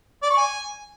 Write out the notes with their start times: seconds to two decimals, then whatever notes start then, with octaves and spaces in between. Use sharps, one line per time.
0.23 D5
0.30 C#6
0.37 G#5